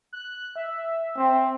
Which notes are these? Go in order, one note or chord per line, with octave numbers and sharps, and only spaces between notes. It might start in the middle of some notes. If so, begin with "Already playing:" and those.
F#6
E5
C4